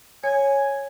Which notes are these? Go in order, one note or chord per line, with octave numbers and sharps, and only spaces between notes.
C#5 G#5